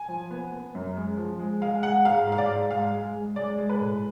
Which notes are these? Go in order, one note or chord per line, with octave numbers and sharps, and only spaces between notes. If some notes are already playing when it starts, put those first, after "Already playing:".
Already playing: G#5
F3
B3
B3
F#2
G#3
F3
G#3
G#3 F5
G#3 F#5
G#2 F5
G#2 F5
D5
G#2
G#3 F5
G#3
G#3
G#3 D5
G#3
B4
A2